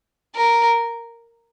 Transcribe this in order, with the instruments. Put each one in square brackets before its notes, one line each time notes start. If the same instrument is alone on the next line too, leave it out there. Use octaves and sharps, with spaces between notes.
[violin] A#4